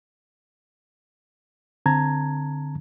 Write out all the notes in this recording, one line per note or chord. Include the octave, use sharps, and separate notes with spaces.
D3 C4 A5 A#5 G#6